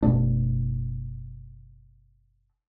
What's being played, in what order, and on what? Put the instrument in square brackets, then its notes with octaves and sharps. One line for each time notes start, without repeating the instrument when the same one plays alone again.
[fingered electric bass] F#1 B2 A3 D4